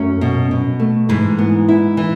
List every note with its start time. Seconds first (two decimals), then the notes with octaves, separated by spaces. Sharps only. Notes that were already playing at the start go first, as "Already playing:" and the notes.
Already playing: F#2 A3 C#4
0.21 B2
0.51 B2
0.80 A3
1.09 G#2 E3
1.38 B3
1.69 E4
1.97 E3